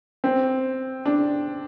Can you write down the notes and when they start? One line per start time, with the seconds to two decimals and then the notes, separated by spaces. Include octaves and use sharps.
0.24 C4
1.05 D4